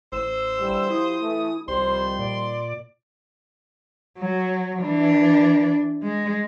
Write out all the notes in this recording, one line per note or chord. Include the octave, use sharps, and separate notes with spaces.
A1 C5 E6
D3 E3 G3
F3 E4 G4 D#6
E3 A3
C2 D#3 F3 G3 C5 C6
A#2 D5
F#3
E3 D4
G#3